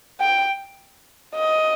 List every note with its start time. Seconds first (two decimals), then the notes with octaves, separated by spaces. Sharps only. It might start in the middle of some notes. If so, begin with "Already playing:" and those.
0.20 G5
1.35 D#5